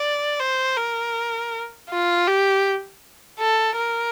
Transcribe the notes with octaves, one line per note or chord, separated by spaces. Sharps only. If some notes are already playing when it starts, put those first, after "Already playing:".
Already playing: D5
C5
A#4
F4
G4
A4
A#4